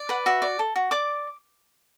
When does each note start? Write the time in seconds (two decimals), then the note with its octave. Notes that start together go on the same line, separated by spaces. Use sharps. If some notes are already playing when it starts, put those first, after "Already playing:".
Already playing: D5
0.09 B4 F#5
0.26 F#4 E5
0.42 D5
0.59 A4
0.76 F#4
0.91 D5 D6